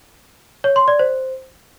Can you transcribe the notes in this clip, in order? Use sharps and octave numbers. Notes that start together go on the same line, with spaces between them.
C#5
C6
D5
C5